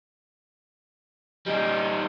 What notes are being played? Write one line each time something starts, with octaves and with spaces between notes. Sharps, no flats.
G3 D#4